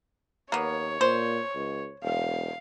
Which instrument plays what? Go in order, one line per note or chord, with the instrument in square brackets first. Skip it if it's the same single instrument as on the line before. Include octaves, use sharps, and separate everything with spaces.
[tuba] D#2 [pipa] A#3 B3 [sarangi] C#5
[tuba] A#2 [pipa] C5
[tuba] C#2
[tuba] E1 [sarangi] F5